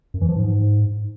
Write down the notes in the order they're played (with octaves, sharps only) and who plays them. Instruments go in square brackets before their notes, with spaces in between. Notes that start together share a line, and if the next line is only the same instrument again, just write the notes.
[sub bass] F#2
E3
F3
G#2